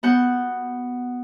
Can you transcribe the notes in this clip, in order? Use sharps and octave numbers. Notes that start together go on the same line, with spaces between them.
B3 F#4 F#5 G6